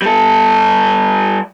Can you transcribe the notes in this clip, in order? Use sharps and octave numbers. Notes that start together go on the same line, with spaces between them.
G3 A4